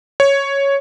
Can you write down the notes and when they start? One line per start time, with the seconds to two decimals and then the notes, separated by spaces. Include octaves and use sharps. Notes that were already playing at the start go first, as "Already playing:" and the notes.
0.20 C#5